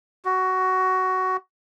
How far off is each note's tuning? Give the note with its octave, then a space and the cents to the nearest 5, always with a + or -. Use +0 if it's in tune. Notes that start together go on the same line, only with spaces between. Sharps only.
F#4 +15